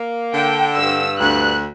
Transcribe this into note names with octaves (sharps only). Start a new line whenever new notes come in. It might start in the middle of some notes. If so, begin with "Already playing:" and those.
Already playing: A#3
D3 G5
G2 E6
D2 F#6